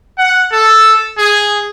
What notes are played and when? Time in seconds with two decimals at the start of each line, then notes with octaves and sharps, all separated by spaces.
0.18 F#5
0.53 A4
1.17 G#4